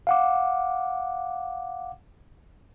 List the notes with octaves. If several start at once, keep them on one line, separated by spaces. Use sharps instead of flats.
F5 F#5 D6